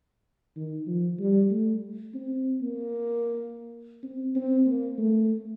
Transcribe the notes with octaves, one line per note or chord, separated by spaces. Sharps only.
D#3
F3
G3
A3
C4
A#3
C4
C4
A#3
A3